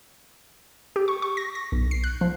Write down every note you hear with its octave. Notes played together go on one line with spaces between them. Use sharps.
G4
C#6
C#6
A#6
A#6
B1
C7
F#6
F3